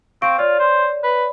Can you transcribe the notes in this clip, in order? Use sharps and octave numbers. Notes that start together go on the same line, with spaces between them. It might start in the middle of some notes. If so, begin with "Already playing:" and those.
C4 F5 C#6 D7
F4 C#5 D5
C5
B4